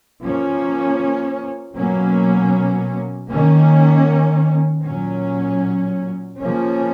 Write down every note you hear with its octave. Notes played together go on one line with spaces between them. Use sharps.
F3 A#3 C#4
B2 F#3 A#3 C#4
D#3 A#3 C#4
A#2 F#3 C#4
C#3 F3 A#3 C#4